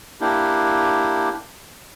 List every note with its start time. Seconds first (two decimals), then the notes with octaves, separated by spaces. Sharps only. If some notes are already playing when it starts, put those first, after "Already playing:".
0.21 A#3 D4 E4 G4